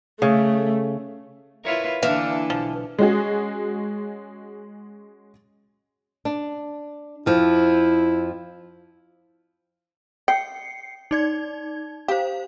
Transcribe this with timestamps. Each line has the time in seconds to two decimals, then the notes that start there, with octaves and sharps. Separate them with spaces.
0.22 C#3 A3
1.65 E4 F4 A#4 B4 C#5 F5
2.03 D3 E3 A#3 D4 A4 E5 F5
2.50 B1 F3
2.99 G#3 C#4 F#4 G#4
6.25 D4
7.26 F2 F3 E4
10.28 G5 C7 C#7
11.11 D#4 D5 G#6
12.08 G4 C5 F5